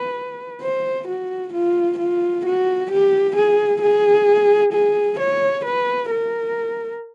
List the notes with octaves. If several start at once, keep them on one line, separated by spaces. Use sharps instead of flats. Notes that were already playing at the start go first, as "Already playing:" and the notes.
Already playing: B4
C5
F#4
F4
F4
F#4
G4
G#4
G#4
G#4
C#5
B4
A#4